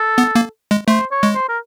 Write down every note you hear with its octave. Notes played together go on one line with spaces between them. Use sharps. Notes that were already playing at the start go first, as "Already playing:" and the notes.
Already playing: A4
B3
A#3
G#3
A3 C5
C#5
G#3
C5
A#4